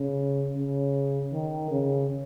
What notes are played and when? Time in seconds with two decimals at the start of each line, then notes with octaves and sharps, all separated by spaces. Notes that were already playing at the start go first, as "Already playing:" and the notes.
Already playing: C#3
0.56 C#3
1.33 D#3
1.72 C#3